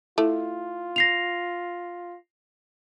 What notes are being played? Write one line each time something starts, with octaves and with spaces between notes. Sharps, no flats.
A3 E4 F4
A#6 C7 F7